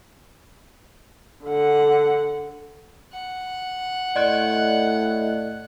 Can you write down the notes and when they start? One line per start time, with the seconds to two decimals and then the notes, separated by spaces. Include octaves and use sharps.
1.44 D3 F#5
3.12 F#5
4.16 A2 D5 D#5 F#6